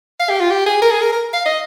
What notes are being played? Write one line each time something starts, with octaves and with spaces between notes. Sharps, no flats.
F5
G4
F4
G4
G#4
A#4
G#4
A#4
A#4
F5
D#5